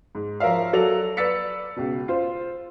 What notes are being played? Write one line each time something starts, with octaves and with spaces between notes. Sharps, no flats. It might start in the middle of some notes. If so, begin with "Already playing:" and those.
G#2
F3 A#4 C#5 E5 F5
F#3 F#4 A4 D5 F5 F7
B4 D5 E6 A6 B6 C#7
C#2 B2
F4 C5